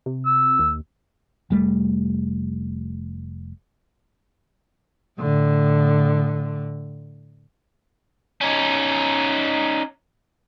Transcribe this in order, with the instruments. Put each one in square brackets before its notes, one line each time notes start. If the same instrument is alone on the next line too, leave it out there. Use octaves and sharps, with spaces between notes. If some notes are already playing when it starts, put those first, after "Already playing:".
[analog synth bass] C3
[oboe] E6
[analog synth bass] D#2
[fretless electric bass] F1 G3 A3
[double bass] A2 D3
[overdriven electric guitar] C#4 D#4